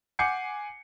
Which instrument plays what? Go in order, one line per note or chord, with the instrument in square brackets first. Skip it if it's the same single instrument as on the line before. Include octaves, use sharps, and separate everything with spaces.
[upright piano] F#5 G#5 D6 G6 C7 C#7